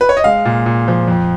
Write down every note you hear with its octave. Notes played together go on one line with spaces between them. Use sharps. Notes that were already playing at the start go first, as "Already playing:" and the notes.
B4
C#5
D#5
G#3 F5
A#2
A#2
F3
F2